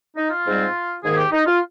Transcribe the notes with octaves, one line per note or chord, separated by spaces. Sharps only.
D#4
F4
G#2 G3 C4
G#2 D#3 A#3 G#4
G4
D#4
F4